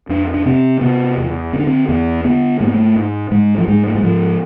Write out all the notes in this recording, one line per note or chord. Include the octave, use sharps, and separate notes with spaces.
F2 D4
D4
C3 C4
C3 B3
E2
D3 C4
D4
C4
E2 B3
D3 B3
G#2 A3
B3
A3
G#2
G#2 G#3
F3
G#2 G#3
A3
G#3
G#2 F3